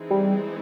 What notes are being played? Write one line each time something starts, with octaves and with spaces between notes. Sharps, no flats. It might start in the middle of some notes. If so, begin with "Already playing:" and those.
Already playing: E3 G#3 C4 D#4 G#4
G3